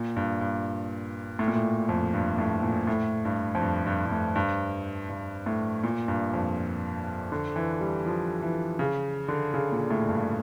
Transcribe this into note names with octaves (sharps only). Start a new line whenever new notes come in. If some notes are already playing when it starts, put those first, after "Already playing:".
Already playing: A#2
G2
G2
A2
A#2
A2
F2
G2
A2
A#2
A2
G2
F2
G2
G2
G2
A2
G2
G2
A2
A#2
G2
F2
D3
E3
G3
F3
E3
C#3
D3
C#3
A#2
A2
G2